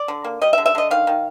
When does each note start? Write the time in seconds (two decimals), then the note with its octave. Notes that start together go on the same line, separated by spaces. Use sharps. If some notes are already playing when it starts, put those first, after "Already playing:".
Already playing: D5
0.08 D3
0.24 A#3
0.41 G3 D#5
0.53 E5
0.58 D3
0.66 E5
0.75 D3 D#5
0.91 D#3 F5
1.07 D#3